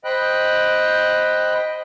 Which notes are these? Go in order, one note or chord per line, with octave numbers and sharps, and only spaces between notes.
C5 D#5 G5 B5 F#6